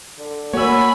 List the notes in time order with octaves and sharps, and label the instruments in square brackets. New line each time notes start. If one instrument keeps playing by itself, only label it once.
[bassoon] D3
[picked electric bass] A#3 [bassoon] F#4 [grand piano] C#5 E6 [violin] G#5 B5